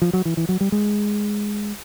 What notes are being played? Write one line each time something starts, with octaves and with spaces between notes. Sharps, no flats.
F3
F#3
E3
E3
F#3
G3
G#3